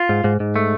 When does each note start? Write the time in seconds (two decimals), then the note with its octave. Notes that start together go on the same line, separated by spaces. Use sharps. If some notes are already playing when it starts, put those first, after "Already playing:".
Already playing: F4
0.09 G#2
0.24 G#2
0.40 G#2
0.56 A3